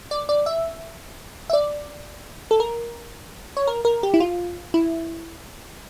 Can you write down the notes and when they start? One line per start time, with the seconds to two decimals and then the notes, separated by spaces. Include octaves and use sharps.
0.11 D5
0.29 D5
0.46 E5
1.50 E5
1.53 D5
2.51 A4
2.60 A#4
3.57 C#5
3.67 A#4
3.85 A#4
4.03 G4
4.14 E4
4.20 F4
4.74 E4